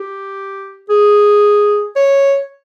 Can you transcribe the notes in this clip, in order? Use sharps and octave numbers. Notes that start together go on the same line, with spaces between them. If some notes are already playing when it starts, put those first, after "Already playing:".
Already playing: G4
G#4
C#5